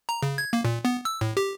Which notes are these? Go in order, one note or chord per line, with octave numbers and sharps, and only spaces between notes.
A#5
C#3
G#6
A#3
A#2
B3
E6
A2
G4